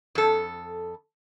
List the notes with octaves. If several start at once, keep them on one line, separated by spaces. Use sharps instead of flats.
F2 A4